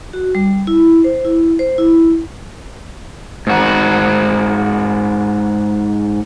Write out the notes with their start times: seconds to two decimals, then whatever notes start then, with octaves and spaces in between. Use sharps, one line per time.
0.13 F#4
0.35 G3
0.67 E4
1.04 C5
1.25 E4
1.59 C5
1.78 E4
3.47 G#2 F#4